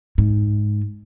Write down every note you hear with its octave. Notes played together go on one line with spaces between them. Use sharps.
G#2